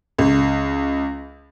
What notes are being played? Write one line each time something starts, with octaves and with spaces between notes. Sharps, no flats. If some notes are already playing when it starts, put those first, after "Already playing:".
C#2